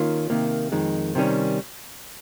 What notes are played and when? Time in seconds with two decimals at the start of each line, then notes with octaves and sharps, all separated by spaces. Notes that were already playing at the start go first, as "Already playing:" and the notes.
Already playing: D#3 A#3 C#4 F4
0.30 C3 D#3 A#3
0.72 F2 D#3 G#3
1.15 C3 D#3 G3 C#4